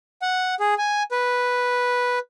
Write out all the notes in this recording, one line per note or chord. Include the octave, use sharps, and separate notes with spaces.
F#5
G#4
G#5
B4